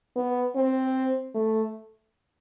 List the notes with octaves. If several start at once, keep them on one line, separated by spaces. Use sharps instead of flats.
B3
C4
A3